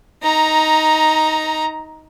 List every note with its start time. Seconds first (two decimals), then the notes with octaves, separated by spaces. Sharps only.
0.23 D#4 A#5